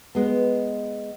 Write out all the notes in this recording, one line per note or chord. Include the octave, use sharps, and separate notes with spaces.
G#3 B3